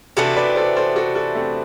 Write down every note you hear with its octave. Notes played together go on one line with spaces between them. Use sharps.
C3 E3 B3 D4 F#4 A4
B4 D5
A4 C5
A4 C5
F#4 A4
F#4 A4
A3 C4